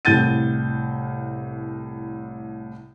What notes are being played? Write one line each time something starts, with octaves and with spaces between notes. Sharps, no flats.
C2 A2 G6 A6 D#7